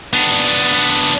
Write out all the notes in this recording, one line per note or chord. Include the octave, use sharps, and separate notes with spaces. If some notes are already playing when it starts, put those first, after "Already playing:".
B3 D4